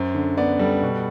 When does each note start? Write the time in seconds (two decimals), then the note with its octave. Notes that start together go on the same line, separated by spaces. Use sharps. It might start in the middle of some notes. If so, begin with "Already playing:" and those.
Already playing: F#2 C5
0.14 D3
0.37 B3 D5
0.59 G3 A4
0.83 B2